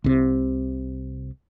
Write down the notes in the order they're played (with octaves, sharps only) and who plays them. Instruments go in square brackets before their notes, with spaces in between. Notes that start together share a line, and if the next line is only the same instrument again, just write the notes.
[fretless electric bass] C2 C3